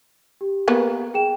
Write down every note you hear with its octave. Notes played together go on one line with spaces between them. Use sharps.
G4
A#3 B3
G#4 G5 E7